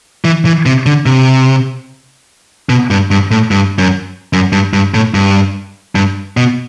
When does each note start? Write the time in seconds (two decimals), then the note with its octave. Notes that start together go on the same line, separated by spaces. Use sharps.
0.25 E3
0.45 E3
0.66 C3
0.86 D3
1.06 C3
2.69 B2
2.90 G2
3.11 G2
3.31 A2
3.51 G2
3.78 F#2
4.33 F#2
4.52 G2
4.73 G2
4.94 A2
5.14 G2
5.95 G2
6.37 B2